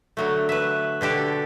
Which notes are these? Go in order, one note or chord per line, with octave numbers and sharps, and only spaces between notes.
D3 F#3 A3
B4 E5
B2 D3 G4 A4